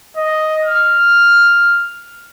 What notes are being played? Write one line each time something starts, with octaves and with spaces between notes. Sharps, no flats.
D#5
F6